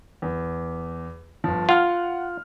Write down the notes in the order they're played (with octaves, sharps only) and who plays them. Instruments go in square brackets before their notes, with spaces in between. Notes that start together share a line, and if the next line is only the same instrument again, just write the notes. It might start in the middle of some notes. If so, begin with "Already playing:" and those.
[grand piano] E2
G1 F3
[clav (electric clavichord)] F4 [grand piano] F#5 F6